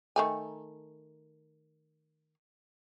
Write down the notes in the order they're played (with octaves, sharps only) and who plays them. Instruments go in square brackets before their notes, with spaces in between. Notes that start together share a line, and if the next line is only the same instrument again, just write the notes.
[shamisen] D#3 A3 G#5